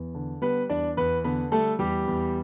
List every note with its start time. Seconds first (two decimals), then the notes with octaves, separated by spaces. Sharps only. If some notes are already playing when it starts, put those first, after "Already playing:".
Already playing: E2
0.15 D3
0.42 G3 B3 B4
0.69 E2 D4 D5
0.97 E2 B3 B4
1.24 D3 B3 B4
1.52 G3 A3 A4
1.79 E2 G3 G4
2.08 E2